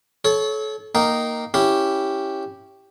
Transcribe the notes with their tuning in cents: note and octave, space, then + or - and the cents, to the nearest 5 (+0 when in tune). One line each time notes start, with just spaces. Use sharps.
A4 -35 C#5 +0
A#3 +0 D#4 +0 G5 -20
C#4 +0 E4 +0 G4 +0